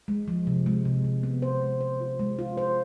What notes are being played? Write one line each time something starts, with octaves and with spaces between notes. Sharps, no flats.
G#3
F3
C3
G#3
C3
C3
B3
C5
G#3
C5
F4
G#3
F4
C5